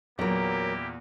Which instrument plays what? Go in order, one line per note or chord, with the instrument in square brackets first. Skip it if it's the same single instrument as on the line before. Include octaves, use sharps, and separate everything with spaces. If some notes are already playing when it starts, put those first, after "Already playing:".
[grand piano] E2 A#2 [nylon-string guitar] F#3 A#4 [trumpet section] A#3 E4 G4